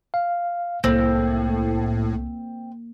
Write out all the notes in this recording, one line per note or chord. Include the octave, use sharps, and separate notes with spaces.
F5
C2 A2 A#3 C4